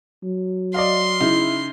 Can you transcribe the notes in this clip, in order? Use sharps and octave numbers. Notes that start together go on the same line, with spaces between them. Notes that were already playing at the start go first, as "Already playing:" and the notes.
F#3
D5 D#5 F5 C6
C#3 D#4 E4